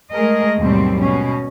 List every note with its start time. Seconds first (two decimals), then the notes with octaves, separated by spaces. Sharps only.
0.12 G#3 A3 G#4 A#4 D#5
0.59 D#2 G#2 B2 F#3 G3 C4
0.99 B2 C#4